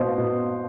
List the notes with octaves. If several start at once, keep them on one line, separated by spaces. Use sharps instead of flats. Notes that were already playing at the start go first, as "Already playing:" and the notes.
Already playing: B2 C5 C6
B2